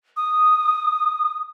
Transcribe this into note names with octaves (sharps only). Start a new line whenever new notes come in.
D#6